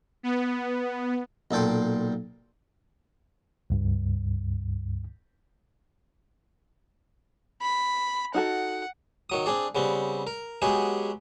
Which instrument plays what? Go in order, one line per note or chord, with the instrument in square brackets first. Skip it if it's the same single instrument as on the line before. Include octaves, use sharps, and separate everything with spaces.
[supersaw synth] B3
[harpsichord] B1 A#2 A4 G5 C6
[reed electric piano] C#2 G2
[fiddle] B5
[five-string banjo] D#4 F#4 A4 [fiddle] F#5
[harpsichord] D#3 F#3 D#6
C4 D4 G#4 D5
C#3 G3 B3 C4
A#4
F#3 G#3 B3 G4 G#4